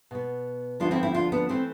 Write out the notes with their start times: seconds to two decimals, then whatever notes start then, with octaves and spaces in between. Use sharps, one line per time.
0.11 B2 B3
0.80 D2 D3 F3 B3 D4 F4
0.91 C4 E4
1.03 C4 E4
1.14 D4 F4
1.32 B3 D4
1.49 E3 A3 C4